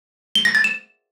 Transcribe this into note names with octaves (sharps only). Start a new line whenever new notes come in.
G7
A#6
A6
E7